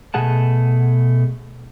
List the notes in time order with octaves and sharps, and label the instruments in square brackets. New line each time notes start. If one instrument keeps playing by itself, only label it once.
[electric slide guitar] B2 A3 G#4 F#5 A5